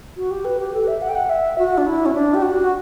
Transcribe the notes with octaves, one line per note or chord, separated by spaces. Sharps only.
F#4
G4
B4
G4
A4
E5
F#5
G5
F#5
E5
F#4
D4
E4
C#4
D4
G4
F#4